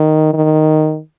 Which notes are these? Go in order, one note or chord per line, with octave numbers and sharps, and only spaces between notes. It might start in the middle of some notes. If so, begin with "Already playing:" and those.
Already playing: D#3
D#3